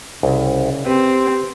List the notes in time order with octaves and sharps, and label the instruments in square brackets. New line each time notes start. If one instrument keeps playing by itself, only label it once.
[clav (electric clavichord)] C2 [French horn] C#3
[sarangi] C4 [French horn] G4 [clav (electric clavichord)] B4